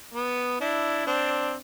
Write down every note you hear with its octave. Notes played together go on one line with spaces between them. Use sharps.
B3
D4 E4
C4 D4